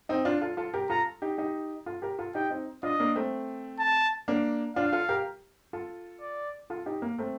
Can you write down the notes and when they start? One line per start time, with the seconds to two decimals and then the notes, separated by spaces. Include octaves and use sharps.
0.09 C4 D#4
0.25 D4 F4
0.42 F4 A4
0.57 F4 A4
0.74 G4 A#4
0.89 F4 A4 A#5
1.22 D#4 G4
1.38 D#4 G4
1.86 F4 A4
2.02 G4 A#4
2.19 F4 A4
2.35 D#4 G4 G5
2.51 C4 D#4
2.83 D4 F4 D#5
3.00 A#3 D4
3.15 A3 C4
3.79 A5
4.28 A#3 D4
4.76 D4 F4 F5
4.93 F4 A4
5.09 G4 A#4
5.73 F4 A4
6.21 D5
6.70 F4 A4
6.86 D#4 G4
7.02 A#3
7.18 A3 C4